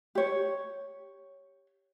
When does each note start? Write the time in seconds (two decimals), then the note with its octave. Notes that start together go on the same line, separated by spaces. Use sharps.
0.15 G4 C#5